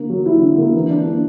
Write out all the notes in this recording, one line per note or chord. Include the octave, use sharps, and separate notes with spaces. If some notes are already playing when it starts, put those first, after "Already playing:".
Already playing: D3 A#3
F#3
E4
D3
A#3
E3
D4
A#3